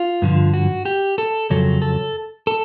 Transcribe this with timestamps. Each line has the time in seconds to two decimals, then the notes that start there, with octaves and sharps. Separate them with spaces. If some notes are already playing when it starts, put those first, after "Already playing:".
Already playing: F4
0.22 G2 D3 F3
0.54 F#4
0.85 G4
1.18 A4
1.50 F2 C#3 F#3 A4
1.82 A4
2.47 A4